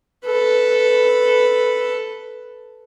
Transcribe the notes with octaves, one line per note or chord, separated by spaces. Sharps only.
A4 B4